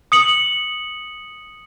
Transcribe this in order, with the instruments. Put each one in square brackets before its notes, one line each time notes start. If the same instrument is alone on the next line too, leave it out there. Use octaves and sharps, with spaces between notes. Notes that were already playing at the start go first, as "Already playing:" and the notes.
[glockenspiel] D#6 C#7 F#7